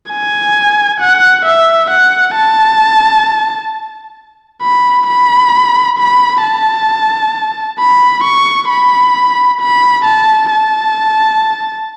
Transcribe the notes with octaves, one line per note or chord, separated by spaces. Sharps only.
G#5
F#5
E5
F#5
A5
B5
B5
B5
A5
B5
C#6
B5
B5
A5
A5